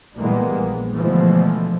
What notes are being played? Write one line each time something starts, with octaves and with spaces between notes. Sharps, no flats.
A#2 E3 G3 G#3 A#3 B3
A#1
B2 D3 E3 F3 G#3 A3